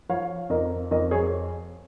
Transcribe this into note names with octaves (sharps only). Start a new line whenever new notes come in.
F3 C#5 F5
F2 A#4 D#5
F2 A#4 D#5
A#4
G#4 C#5